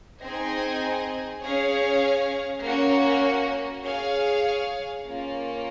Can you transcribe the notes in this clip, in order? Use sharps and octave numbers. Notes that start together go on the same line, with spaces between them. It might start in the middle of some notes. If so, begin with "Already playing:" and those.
C4 D#4 G#4 D#5 G#5
C#4 G#4 C#5 F5
A#3 C#4 F#4
G#4 C#5 F5
A#3 C#4 F4